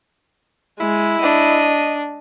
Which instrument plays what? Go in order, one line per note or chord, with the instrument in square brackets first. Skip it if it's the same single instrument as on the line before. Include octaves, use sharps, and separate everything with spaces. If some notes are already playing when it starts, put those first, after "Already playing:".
[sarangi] G#3 [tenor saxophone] E4
[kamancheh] D4 [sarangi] D#5